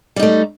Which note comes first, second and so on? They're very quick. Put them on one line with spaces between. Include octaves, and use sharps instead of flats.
G3 D#4 A3